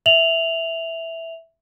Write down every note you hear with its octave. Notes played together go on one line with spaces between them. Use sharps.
E5 F7 F#7